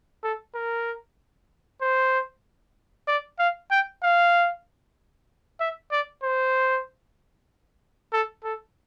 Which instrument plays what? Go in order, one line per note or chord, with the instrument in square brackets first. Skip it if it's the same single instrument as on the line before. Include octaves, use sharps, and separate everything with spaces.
[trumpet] A4
A#4
C5
D5
F5
G5
F5
E5
D5
C5
A4
A4